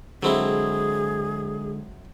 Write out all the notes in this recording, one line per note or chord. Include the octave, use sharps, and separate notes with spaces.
D3 F#3 G#3 C4 E4 G#4